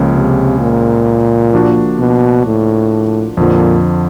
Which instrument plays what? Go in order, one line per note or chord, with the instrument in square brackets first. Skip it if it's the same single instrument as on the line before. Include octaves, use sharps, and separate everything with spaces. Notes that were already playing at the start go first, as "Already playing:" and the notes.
Already playing: [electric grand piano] C#2 C#3 F3 A#3 C#4
[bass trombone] C3
A#2
[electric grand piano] F3 A#3 D4 F#4
[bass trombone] B2
A2
[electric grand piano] F2 D3 F3 [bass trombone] A#2